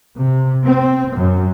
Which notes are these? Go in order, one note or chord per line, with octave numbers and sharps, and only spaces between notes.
C3
C4
F#2